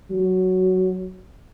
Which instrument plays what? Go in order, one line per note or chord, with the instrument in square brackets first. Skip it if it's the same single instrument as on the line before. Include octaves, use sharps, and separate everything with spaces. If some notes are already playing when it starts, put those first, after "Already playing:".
[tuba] F#3